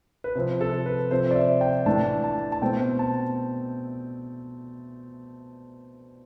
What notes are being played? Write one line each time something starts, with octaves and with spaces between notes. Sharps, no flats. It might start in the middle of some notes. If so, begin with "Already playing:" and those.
B4
C3 F3 C4 C5
A4
B4
C3 F3 C4 C5
D5
E5
G5
A2 E3 A3 D4 A5
A5
A5
B2 A3 C4 G5
A5